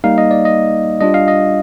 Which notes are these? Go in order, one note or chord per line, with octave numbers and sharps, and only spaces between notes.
G3 A#3 D#4 F5
D#5
D5
D#5
G3 D4 F4 D#5
F5
D#5